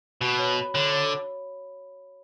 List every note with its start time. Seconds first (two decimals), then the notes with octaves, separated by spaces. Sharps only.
0.21 B2 F#4
0.39 C#5
0.57 B5
0.74 D3 C#5
0.92 C#5